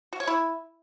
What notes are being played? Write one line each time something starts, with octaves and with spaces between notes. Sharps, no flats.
F#4
C#5
E4